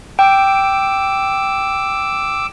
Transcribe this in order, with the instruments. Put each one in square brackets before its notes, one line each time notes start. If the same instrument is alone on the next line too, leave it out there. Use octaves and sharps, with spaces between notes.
[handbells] G5 [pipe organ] D6 E6